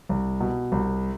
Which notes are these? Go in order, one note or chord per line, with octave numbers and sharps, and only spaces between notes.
C2
B2
C2